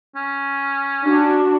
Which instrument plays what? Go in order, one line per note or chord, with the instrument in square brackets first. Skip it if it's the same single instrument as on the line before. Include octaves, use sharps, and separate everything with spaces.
[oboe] C#4
[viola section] D4 F#4